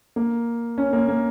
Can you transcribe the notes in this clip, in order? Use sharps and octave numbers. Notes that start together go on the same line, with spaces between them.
A#3
C#4
A#3
A#3